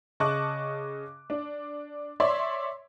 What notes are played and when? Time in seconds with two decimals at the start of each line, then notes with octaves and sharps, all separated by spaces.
0.20 C#3 D#5 A5 C#6 D6 F#6
1.30 D4
2.20 C#5 D5 E5 C6 C#6